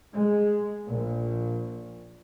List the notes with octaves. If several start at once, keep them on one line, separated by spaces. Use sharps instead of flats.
G#3
A#1